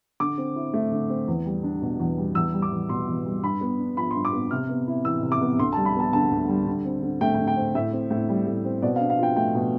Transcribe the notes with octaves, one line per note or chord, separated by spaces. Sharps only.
D3 D6
C4
E4
A3
D3
C4
E2
G3
D4
B2
E2
G3
E2 E6
G3
D6
E2
B2 C6
E2
G3
G2 B5
B3
D4
F3 B5
C6
G2
D6
B3
C3 F6
B3
E4
E3 E6
C3
D6
B3
D2 C6
A5
G3
B5
B3 A5
D3 A5
D2
G3
D3
C4
D3
A3 G5
G5
D3
G5
C4
A2 E5
C4
A2
G3
A2
C4
B2 D5
F5
D4
F5
F4 G5
A3 G5
B2